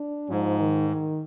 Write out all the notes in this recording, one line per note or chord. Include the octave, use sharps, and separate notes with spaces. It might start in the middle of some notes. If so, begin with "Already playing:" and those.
Already playing: D4
G#2 F3
D#3
D#3